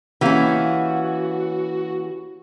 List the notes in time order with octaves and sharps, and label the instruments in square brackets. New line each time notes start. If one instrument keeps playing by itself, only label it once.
[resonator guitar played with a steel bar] E3 C#4 [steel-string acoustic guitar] A#3 G4 F5 [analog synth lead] F#4